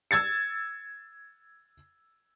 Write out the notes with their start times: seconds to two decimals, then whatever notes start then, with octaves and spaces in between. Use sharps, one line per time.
0.11 E6 G#6 A6 C#7